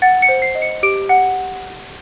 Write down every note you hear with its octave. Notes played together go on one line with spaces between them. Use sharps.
F#5 A6
C#7
C5
C7
D#5
C#7
G4 D7
F#5